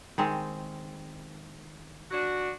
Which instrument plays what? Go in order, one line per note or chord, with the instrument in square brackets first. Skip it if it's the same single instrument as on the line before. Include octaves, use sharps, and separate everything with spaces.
[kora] D#3 G#3 C4
[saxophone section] D4 F#4